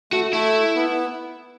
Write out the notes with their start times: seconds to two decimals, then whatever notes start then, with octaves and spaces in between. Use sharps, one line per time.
0.12 A3 F#4
0.33 A3 E4
0.76 B3